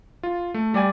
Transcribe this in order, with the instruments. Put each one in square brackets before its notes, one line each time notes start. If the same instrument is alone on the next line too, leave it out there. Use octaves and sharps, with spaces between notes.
[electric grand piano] F4
A3
[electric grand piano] G3 D5 G#5 [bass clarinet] G4